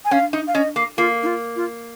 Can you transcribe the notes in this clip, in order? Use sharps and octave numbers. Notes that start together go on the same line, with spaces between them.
G#5
C#4 F5
D#4
F5
C#4 D#5
A#3
A#3 F4
D#4
F4
F4